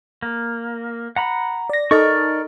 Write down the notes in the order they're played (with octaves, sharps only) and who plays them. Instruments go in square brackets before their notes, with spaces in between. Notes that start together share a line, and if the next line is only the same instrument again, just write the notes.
[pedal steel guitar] A#3
F#5 A#5 B5
[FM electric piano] D5 A#6
[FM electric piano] D#4 A4 D#5 [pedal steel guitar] A#4 D5 C#6